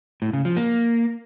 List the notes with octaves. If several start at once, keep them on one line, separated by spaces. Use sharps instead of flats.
A2
C#3
F3
A#3